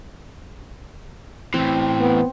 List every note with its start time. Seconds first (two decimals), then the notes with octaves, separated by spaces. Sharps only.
1.54 A2 E3 C4
2.00 B3